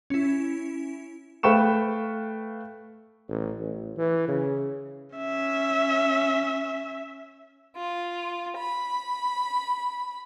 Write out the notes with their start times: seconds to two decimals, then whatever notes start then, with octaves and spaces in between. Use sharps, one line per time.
0.10 C#4 E4
1.43 A3 B4 F5 G5 C#6 E7
3.29 A1
3.60 A1
3.97 E3
4.28 C#3
5.16 C#4 E5
7.77 F4
8.57 B5